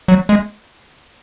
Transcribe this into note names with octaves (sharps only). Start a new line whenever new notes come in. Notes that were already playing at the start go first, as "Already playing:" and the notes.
F#3
G#3